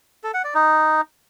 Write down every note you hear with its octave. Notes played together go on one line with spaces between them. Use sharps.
A4
F#5
D5
D#4